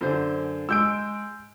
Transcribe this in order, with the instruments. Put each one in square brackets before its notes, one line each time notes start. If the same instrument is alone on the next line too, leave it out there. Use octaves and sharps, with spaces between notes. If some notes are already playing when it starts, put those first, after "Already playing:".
[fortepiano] F#2 D3 C5
[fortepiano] G#3 [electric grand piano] E6 G6 D7